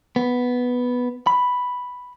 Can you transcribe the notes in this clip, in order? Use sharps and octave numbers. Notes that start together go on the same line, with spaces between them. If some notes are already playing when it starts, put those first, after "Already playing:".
B3
B5